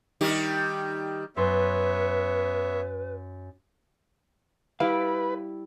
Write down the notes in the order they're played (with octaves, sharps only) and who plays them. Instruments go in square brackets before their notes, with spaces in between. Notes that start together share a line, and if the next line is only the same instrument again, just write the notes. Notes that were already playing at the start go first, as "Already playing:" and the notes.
[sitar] D#3 G3 G4
[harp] F#2 C6 [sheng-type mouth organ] B3 C#5 E5 [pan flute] B4
[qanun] G3 E4 D6 [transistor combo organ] B4 [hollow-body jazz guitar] F5